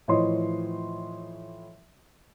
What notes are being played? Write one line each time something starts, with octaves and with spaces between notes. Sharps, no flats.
A2 E3 F3 C#5 D#5 C6